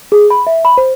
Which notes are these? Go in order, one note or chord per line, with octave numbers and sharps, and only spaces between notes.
G#4
B5
E5
B5
C5